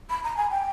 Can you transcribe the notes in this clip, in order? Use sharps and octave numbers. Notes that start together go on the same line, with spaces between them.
B5
A#5
G#5
G5